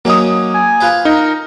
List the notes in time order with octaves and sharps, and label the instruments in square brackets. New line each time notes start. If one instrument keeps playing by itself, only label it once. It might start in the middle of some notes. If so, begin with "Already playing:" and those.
[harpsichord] F#3 C#4 D#4 [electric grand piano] A#3 D#6
[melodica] G#5
[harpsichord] F4 B4 C5
[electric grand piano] D#4 [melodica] A#4